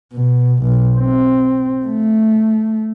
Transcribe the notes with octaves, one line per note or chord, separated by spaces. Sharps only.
B2
B1
C4
A3